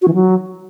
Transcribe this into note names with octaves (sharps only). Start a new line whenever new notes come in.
F#4
E3
F#3